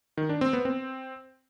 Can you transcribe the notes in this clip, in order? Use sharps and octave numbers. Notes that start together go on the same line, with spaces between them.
D#3
D4
C4
B3
C4